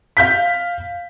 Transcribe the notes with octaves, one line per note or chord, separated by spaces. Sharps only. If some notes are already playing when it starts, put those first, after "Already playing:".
F5 G6 B6